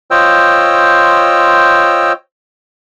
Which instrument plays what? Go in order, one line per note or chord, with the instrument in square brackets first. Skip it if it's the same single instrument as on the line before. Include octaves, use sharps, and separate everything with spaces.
[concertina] F4 C5 C#5 D#5 G5 E6